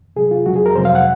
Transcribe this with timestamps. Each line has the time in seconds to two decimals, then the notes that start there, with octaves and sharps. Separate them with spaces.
0.16 C3 F#3 G#4
0.31 F4
0.46 F2 C#3 F#3 F#4
0.56 G#4
0.66 A#4
0.76 F2 C3 F#3 C5
0.85 F5
0.95 F#5